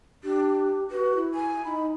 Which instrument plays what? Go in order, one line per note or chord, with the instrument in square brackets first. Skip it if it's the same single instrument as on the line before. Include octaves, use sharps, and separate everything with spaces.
[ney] D4 [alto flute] G4
[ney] F#4 [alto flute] B4
[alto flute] E4
[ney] G#5
[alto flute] D#4 [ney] B5